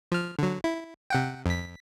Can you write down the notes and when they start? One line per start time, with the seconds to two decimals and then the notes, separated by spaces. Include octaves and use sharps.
0.12 F3 F6
0.39 D3 F#3
0.64 E4
1.10 C3 F#5 G5
1.46 F2 B6